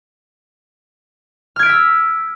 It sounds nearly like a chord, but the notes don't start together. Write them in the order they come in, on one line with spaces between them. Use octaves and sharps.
F6 G#6 D7 B6 E6